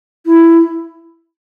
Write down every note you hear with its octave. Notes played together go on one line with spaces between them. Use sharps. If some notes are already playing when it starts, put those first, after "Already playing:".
E4